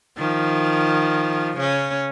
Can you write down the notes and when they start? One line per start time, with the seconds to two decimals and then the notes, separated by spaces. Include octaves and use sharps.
0.17 D#3 F3
1.57 C#3 C#4